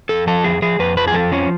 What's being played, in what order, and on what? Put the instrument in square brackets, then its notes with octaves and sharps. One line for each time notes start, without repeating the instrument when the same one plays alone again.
[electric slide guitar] F2 A4
F3 A4
F2 G#4
F3 G#4
F2 B4
F3 B4
G#4
F2 A4
F3 C#4